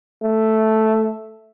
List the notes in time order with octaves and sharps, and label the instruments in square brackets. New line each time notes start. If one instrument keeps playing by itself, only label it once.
[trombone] A3